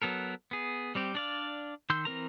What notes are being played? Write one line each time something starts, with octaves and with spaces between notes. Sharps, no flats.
F#3 B3 A4 A#4
B3 G#4
G3 C4 G4
D4 D5 F5
D#3 C6 E6 G6
E3 C4 A#4 A#5